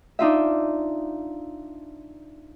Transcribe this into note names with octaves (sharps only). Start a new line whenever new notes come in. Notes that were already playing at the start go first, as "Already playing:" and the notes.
D4 D#4 F4 E5